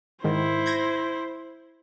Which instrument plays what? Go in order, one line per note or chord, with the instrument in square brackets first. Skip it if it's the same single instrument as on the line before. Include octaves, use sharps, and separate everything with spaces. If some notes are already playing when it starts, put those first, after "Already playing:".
[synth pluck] G#2 D#3 [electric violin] E4 C5
[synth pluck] G6 G#6 A#6